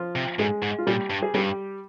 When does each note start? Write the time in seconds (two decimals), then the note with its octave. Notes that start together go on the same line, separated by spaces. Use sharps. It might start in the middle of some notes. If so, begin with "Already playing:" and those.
Already playing: F3 F4
0.16 C3
0.39 G#2 G#3 G#4
0.62 G#2
0.78 F4
0.87 A#2 G3 G4
1.10 G2
1.23 G#4
1.34 G2 G3 G4